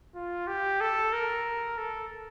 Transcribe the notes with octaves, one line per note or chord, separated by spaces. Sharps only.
F4
G4
A4
A#4
A4